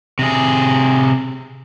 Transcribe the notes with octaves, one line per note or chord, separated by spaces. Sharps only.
C3 G#4